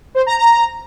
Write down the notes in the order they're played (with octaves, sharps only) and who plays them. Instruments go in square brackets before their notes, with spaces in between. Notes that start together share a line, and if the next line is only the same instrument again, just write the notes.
[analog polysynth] C5
A#5
A#5